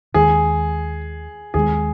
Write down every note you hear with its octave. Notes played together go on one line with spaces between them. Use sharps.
D#2 D#3 G#3 G#4
D#2 D#3 G#3 G#4